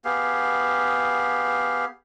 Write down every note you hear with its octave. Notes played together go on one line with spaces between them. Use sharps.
B3 G4 G#4 F5